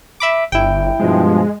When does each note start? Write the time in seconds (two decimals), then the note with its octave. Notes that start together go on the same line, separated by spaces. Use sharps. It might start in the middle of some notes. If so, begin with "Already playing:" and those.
0.20 E5 B5 D6
0.52 G1 E4 G5
1.00 G2 B2 F3 G#3